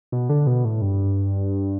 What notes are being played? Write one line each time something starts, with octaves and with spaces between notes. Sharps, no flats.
B2
D3
B2
A2
G2